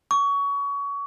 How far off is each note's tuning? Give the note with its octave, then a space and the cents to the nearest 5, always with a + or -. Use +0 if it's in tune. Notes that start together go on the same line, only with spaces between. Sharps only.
C#6 +25